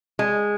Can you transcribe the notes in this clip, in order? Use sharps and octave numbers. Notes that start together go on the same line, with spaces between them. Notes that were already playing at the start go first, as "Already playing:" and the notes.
G#3